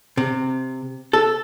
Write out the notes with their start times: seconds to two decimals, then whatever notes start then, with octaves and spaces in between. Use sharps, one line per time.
0.17 C3
1.13 A4